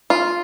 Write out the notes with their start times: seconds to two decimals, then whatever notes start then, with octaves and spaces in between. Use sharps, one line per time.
0.10 F4